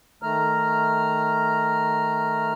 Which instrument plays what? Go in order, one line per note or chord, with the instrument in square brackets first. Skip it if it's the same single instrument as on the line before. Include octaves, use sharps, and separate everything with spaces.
[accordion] D#3 A3 A#5 F6